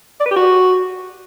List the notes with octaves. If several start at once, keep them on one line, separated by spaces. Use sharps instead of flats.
D5
B4
G4
F#4